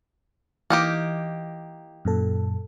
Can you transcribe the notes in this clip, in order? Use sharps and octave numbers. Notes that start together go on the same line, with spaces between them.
E3 A#3 D#4 G4
F#2 A#2 A4